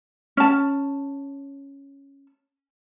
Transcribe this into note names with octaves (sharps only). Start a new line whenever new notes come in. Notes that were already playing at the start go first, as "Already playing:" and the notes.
C#4 A5